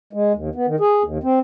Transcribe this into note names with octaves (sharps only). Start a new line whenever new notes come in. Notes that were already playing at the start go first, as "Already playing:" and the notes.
G#3
D#2
B3
D#3
G#4
D#2
C4